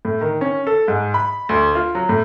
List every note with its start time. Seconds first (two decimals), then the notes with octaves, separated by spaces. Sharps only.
0.05 A2
0.21 D#3
0.41 C#4
0.67 A4
0.88 G#2
1.14 B5
1.49 D2
1.75 F4
1.95 F#3
2.09 A2